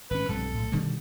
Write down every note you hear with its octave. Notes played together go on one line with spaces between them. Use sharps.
G#1 C#4 B4
B1 G2 F3 C4 A4
A2
B2 D3 D#3 G3